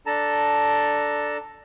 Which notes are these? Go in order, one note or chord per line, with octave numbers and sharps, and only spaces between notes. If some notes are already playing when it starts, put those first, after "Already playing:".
D4 A4 A5 A#5